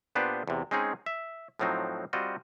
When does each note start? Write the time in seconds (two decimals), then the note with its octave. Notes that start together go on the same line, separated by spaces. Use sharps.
0.15 A#2 B3 D4 G4 B4 C5
0.48 E2 C3
0.71 G#3 C4 C#4 D#4 G#4
1.06 E5
1.59 A2 F3 F#3 C4 D#4
2.13 G3 C4 F4 F#4 D#5